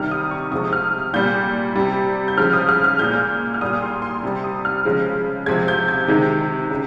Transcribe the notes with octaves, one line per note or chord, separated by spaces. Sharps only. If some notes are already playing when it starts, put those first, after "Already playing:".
Already playing: C3 D#3 G3 F6
D#6
C#6
C3 F3 G#3 D#6
F6
A#2 G3 G6
C3 G3
G6
C#3 F3 G#3 F6
D#6
F6
F6
A#2 G#3 G6
F6
A#2 G3 D#6
C6
C6
C3 G3
D#6
F6
C#3 F3 G#3
C3 F3 G#3 G#6
G6
G#6
C3 D#3 G#3
C#3